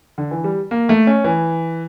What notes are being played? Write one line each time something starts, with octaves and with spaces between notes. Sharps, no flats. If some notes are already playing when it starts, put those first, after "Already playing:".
D3
E3
G3
A#3
A3
C#4
E3